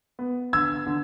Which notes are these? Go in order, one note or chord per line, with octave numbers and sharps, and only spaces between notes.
B3
D3 E6 G#6
D3